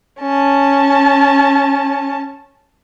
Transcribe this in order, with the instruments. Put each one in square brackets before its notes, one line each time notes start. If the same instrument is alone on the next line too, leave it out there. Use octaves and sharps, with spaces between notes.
[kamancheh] C#4 A5